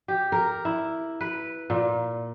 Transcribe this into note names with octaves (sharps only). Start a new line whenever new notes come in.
G4
A#4
E4
B4
A#2